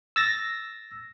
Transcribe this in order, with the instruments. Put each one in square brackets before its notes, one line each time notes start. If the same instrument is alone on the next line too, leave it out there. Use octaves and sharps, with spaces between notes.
[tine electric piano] E6 A6 A#6